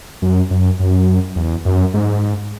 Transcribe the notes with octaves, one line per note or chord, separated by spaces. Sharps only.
F#2
F#2
F#2
E2
F#2
G#2